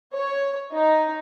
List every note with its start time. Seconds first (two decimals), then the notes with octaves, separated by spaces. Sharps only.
0.15 C#5
0.74 D#4